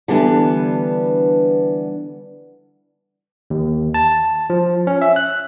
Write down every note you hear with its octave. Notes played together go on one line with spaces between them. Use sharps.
D3 E3 G3 B3 D4
D#2
A5
F3
C#4
E5
F#6